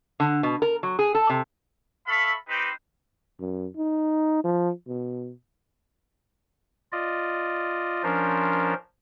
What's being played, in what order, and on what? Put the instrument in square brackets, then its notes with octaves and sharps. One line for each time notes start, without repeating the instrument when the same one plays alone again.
[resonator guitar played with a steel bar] D3
B2
A#4
F#3
G#4
A4
C3
[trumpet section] A4 E5 F5 B5 C#6
C4 D#4 G4 B4 C5
[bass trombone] F#2
D#4
F3
B2
[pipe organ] F4 D5 D#5
F3 C#4 D4 A#4 C5